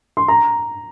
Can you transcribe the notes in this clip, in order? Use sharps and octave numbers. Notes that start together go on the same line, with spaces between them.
C6
A#5